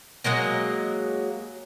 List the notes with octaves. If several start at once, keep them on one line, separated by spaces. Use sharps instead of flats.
F#3 G#3 A#3 D#5